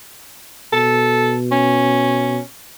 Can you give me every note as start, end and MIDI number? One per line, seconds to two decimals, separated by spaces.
0.73 2.38 47
0.73 1.33 69
1.52 2.41 61